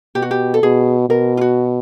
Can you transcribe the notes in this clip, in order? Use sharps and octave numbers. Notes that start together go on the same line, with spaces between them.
B2 G4
F#4
G4
A4
B2 G#4
B2 A#4
F4
F#4